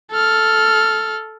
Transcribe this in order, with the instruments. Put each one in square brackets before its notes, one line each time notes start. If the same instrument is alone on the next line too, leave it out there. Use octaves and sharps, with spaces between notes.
[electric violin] A4 F6